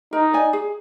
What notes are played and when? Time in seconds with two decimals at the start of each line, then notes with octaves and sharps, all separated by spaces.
0.13 D#4 A#4
0.33 D5 G#5
0.53 G#4